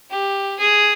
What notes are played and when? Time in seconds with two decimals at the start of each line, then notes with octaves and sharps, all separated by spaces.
0.11 G4
0.59 G#4